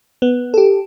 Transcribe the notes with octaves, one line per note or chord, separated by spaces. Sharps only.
B3
G4 A4